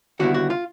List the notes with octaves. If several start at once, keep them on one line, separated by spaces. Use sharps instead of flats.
D#2 D3 G3 B3 E4 F#4
F#4
F4